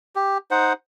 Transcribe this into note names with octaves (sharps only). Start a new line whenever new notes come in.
G4
D#4 C5 F#5